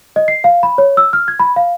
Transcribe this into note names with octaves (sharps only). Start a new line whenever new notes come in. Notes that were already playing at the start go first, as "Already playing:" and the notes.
D#5
C7
F5
B5
C#5
E6
F6
G#6
B5
F5